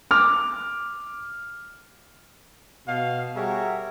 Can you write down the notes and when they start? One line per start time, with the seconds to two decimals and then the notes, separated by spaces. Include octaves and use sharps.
0.11 D6 F6
2.88 B2 F5
3.36 G3 F#4 G#4 A#4 C#5 E5